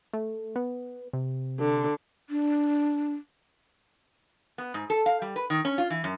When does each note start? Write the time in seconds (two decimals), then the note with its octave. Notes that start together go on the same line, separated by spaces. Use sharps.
0.13 A3
0.56 B3
1.13 C3
1.59 D3
2.30 D4
4.58 B3
4.74 G#2
4.90 A4
5.06 F5
5.22 G3
5.36 B4
5.50 D#3
5.65 C#4
5.78 F4
5.90 E3
6.04 F#2